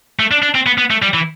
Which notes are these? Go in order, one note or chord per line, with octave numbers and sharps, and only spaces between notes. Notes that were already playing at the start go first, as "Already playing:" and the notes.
A3
D4
D4
C4
B3
B3
A3
G3
E3